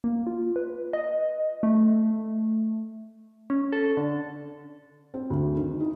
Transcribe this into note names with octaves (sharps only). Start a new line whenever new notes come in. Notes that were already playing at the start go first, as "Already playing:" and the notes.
A#3
F4
B4
D#5
A3
C#4
A4
D3
C4
D2
D#3
D#4